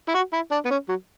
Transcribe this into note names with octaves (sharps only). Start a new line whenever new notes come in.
E4
F#4
E4
D4
B3
C#4
F#3